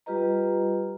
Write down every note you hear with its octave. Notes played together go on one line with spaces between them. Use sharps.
G3 F4 G4 B4 D#5 A#5